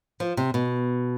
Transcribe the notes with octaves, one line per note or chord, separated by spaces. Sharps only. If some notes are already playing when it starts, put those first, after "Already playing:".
F3
C3
B2